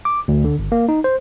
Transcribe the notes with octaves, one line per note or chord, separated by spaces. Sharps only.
D6
D2
D3
G1
A#3
D#4
C5